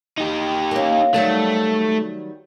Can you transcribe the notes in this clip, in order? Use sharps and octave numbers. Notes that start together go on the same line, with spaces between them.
D#4 G4
A#3 C#4
D#3 F#3 G3 A3